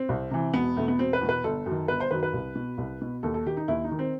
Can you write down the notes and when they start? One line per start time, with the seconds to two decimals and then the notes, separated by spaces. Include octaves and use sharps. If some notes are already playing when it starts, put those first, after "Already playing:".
Already playing: C4
0.09 C2
0.31 C3 E3
0.54 E1 B3
0.77 E2 B2 A3
0.88 B3
0.99 E1 C4
1.13 B4
1.21 E2 B2
1.29 B4
1.44 G1 A4
1.66 F#2
1.71 D#3
1.88 G1 B4
2.00 C5
2.11 F#2 D#3 B4
2.23 B4
2.33 C2
2.55 B2
2.78 C2
3.02 B2
3.23 D#2 A4
3.34 A4
3.46 D#3 G4
3.57 D#4
3.68 D#2 E4
3.84 D#4
3.92 D#3
3.99 C4